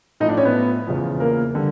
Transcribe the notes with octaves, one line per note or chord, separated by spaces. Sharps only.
A2 F3 D#4 D#5
D4 D5
C#4 C#5
B3 B4
E2 C#3 F3
A#3 A#4
D3 G3